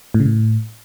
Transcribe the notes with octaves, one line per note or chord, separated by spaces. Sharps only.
A2
C#3
A2